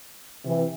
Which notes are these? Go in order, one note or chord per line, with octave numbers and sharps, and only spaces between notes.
C3 E3